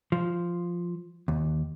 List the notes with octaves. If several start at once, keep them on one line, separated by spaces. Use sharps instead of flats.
F3
D#2